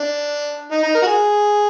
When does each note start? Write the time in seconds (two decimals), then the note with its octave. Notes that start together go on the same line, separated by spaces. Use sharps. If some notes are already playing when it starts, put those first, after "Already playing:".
Already playing: D4
0.71 D#4
0.83 D#4
0.95 A#4
1.03 F#4
1.07 G#4